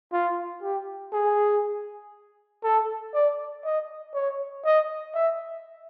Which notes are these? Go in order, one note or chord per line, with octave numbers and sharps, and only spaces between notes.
F4
G4
G#4
A4
D5
D#5
C#5
D#5
E5